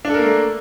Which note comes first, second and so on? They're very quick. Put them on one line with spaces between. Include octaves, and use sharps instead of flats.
D4 A4 A#4 A#3 A3